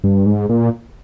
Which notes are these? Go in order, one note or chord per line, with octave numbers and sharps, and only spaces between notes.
G2
G#2
A#2